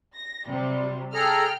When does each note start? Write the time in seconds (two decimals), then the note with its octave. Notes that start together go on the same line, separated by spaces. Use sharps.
0.15 A#6
0.48 C3 F#3 G3
1.14 G#4 A4 G5 A#5 F6